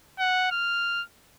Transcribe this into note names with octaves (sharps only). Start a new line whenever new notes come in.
F#5
F6